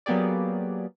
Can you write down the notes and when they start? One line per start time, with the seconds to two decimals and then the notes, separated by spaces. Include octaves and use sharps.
0.06 F#3 A#3 B3 G4 G#4 D5